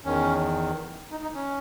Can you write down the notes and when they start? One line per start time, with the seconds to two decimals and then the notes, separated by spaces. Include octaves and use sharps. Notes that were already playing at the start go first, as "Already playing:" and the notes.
0.05 E2 D#3 C#4
1.11 D#4
1.22 D#4
1.35 C#4